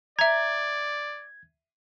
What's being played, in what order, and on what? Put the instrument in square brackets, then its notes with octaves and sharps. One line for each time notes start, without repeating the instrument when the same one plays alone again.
[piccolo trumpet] D5 [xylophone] E5 A#5 [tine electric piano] G#6